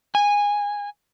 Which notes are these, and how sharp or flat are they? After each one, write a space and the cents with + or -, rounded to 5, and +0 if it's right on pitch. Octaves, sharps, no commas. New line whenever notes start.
G#5 -15